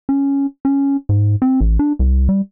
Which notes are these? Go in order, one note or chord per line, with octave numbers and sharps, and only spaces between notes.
C#4
C#4
G#2
C4
A1
D4
C2
G3